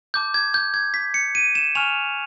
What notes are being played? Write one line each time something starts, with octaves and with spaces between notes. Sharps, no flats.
A5 D6 G6
G#6
G6
G#6
B6
C#7
D#7
E7
G#5 C#6 F6 F7